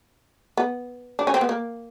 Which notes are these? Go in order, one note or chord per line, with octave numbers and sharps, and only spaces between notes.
B3
D4
C#4
C4
B3
A#3